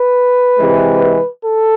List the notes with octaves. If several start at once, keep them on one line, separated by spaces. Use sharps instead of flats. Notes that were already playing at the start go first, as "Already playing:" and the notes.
Already playing: B4
C3 E3 G#3
A4